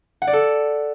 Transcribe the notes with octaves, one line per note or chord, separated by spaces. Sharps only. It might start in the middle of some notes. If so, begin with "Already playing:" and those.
F#5
D5
A4